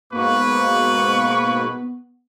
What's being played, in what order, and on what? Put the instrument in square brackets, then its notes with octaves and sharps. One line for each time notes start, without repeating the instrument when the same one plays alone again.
[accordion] G#2 B2 A#3 [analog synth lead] B3 [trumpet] B4 [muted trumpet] C#6